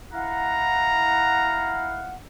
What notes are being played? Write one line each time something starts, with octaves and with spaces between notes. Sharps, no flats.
E4 F5 F#5 A#5